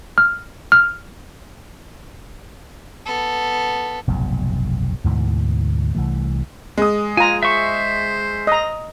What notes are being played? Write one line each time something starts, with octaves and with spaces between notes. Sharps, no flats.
F6
F6
B3 A4
F1 B1 G2 A#2
D2 G#2 B2 E3
C2 E3 A3
G#3 D#6
F4 G#5 A#5
C5 E5 C#6
D#5 A#5